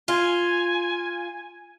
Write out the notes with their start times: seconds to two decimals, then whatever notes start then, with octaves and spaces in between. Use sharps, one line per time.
0.08 F4 G#5